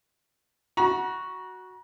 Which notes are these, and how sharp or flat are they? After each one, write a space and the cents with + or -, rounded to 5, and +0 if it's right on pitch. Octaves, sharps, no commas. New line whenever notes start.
F#4 +0 A#5 +40